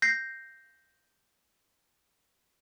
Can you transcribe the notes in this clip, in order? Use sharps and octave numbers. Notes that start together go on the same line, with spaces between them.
G6 A#6 C7